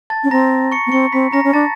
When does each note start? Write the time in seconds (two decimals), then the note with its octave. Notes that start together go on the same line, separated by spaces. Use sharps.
0.10 A5 A6
0.24 C#4
0.31 C4 A#5 A#6
0.72 C#6 C#7
0.87 B3
0.92 C4 C#6 C#7
1.12 C4 B5 B6
1.32 C#4 A#5 A#6
1.44 C#4
1.53 D4 A5 A6